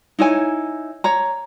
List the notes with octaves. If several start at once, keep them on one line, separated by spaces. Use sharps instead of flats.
D#4 E4 C#5 G#5
C#5 A#5